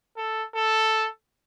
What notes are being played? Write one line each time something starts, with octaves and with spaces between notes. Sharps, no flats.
A4
A4